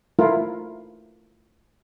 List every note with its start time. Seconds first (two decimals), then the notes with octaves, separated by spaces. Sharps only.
0.19 A3 E4 F4 A#4